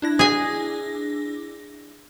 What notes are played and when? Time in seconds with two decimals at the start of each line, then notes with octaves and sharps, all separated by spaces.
0.02 D4 E4 A#6
0.19 G#4 G#5